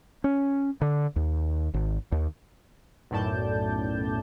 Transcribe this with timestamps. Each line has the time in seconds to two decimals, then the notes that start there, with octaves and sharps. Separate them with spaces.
0.24 C#4
0.81 D3
1.16 D#2
1.74 G#1
2.12 D#2
3.11 B1 F#2 A2 D5 A5 G6